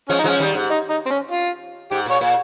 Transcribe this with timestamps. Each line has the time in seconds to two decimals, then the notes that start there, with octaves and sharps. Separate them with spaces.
0.09 F3 G#3 C#4
0.19 D#4
0.24 F3 G#3 C#4
0.40 D#3 G3
0.54 G#2
0.71 D#4
0.90 D#4
1.06 C4
1.11 C#4
1.31 F4
1.91 G#2 G4
2.06 A#2 C#5
2.21 A#2